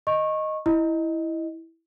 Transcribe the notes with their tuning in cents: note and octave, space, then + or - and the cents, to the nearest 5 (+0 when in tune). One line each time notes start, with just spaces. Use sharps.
D#5 +0 C#6 -20
E4 -5 D#5 +0